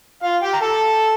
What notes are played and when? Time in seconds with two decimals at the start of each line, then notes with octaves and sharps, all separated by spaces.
0.23 F4 F5
0.42 G4 G5
0.53 A#5
0.62 A4 A5